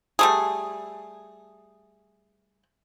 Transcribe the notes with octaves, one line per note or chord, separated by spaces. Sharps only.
G3 A3 G#4